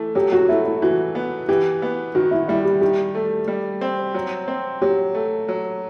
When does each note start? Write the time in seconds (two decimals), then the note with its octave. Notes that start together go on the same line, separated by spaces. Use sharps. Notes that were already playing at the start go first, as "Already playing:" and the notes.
Already playing: E3 A3
0.15 F#3 G4
0.32 F#4
0.49 A3 E4
0.65 E4
0.82 E3 F#4
1.15 B3
1.49 E3 G4
1.82 B3
2.15 D#3 F#4
2.31 E4
2.48 G3 E4
2.65 G4
2.81 D#3 G4
3.15 A3
3.48 G3
3.81 C4
4.14 F#3
4.48 C4
4.82 F#3 G4
5.14 A3
5.48 F#3